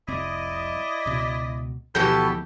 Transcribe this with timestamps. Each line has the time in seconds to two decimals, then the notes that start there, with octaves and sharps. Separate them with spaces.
0.08 F1 C2 C4 E4 D5 D#5
1.06 C#2 B2
1.95 D2 B2 E3 F3 B3 G4 A4 G6